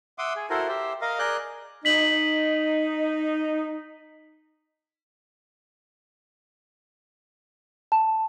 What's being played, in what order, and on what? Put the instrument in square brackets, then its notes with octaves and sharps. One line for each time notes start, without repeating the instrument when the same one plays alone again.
[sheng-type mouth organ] E5 F#5 C6 D6 D#6
G#4
E4 F#4 A4 A#4 C5
G4 C5 E5
A#4 D#5 F5
G#4 A#4 D5 F#6 G6
[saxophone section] D#4 [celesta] B6 F#7
[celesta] A5